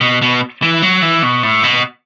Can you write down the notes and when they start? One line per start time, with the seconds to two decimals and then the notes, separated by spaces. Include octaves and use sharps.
0.01 B2
0.22 B2
0.62 E3
0.82 F#3
1.02 E3
1.23 B2
1.43 A2
1.63 B2